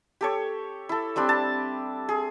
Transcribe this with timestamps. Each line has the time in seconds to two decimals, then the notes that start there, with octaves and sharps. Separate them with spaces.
0.21 G4 A4 C#5
0.89 E4 A4
1.16 G3 C4 D4 G4
1.29 A5
2.09 G#4